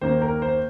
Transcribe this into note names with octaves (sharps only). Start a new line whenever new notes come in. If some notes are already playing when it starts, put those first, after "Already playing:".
D#2 D#3 A#3 C5
A#4
C5